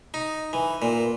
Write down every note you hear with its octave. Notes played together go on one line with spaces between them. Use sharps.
D#4
E3
A#2